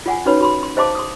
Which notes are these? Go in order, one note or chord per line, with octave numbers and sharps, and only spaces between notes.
F4 F#5 G#5
C#4 D#4 F#4 B4 C#5 B5
F#4 B5 C6
C6
C5 D#5 F5 A5 C6 D6
C6 D#6